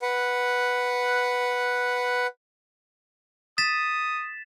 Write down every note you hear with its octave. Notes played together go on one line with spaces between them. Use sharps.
B4 F#5
D#6 A6 B6 E7